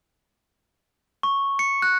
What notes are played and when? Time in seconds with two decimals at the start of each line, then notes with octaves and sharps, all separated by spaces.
1.23 C#6
1.59 C#7
1.82 F#6